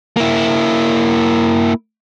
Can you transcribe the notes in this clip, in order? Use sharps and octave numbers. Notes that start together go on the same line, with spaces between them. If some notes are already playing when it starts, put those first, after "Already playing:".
A#3 E4